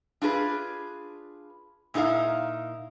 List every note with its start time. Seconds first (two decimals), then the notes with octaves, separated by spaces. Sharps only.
0.22 D4 F4 G#4 B4
1.94 A#2 D#4 E4 A4 F5